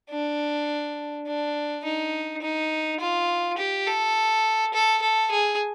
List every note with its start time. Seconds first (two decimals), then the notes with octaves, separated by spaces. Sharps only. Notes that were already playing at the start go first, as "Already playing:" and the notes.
0.10 D4
1.26 D4
1.84 D#4
2.42 D#4
3.00 F4
3.58 G4
3.87 A4
4.74 A4
5.02 A4
5.31 G#4